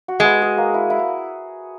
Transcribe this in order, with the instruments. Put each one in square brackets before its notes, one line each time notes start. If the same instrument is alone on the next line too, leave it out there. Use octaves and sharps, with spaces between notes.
[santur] F#4
[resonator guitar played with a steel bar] G#3 [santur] B3
[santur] G#4
A#3
E4
E4